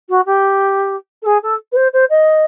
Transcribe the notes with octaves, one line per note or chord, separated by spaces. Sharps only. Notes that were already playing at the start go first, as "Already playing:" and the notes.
F#4
G4
A4
G#4
A4
B4
C5
C5
D#5